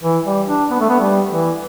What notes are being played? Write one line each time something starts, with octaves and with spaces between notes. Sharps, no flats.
E3
G3
D4
B3
A3
B3
G3
E3